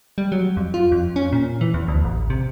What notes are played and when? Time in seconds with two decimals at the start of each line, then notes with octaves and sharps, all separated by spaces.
0.18 G3
0.32 F#3
0.57 F2
0.74 F4
0.92 F2
1.16 C#4
1.32 A#2
1.61 E3
1.74 E2
1.88 D2
2.04 A1
2.30 C3